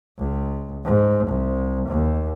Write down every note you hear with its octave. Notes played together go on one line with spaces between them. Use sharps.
C#2
G#2
C2
D#2